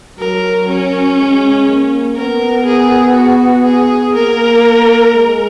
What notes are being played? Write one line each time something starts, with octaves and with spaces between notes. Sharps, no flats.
F#3 A#4
C#4
G#3
A#3
B3 A#4
G#4
F#4
G#4
A#3 A#4
G#3